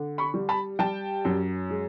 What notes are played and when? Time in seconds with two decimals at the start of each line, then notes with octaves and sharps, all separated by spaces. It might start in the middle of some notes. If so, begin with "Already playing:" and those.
Already playing: D3
0.18 B5 C#6
0.34 G3
0.49 A5 B5
0.79 G3 G5 A5
1.25 F#2
1.70 G#3